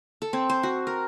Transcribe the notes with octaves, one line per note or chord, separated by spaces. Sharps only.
A4
C4
C5
F#4
A#4